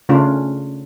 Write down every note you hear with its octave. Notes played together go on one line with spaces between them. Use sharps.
C#3 A3 C#4 D4 F4